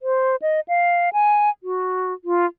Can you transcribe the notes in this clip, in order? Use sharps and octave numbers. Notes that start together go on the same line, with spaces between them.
C5
D#5
F5
G#5
F#4
F4